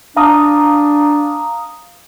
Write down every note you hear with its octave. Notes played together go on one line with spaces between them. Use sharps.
D4 F5 A#5 D#6